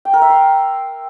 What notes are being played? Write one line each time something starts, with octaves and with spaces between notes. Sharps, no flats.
G5
A#4
E5
C6